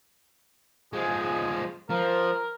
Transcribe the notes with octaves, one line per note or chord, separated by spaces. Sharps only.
F3 G#3 G#4
F3 A#4